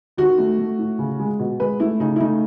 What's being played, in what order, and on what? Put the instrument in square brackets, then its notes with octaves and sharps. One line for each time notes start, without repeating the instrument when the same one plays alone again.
[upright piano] D#3 F#4
A3
A3
A2
C#3
G#3
B2
G#3 B4
A3 E4
C#3 D#4
E4
A3 D#4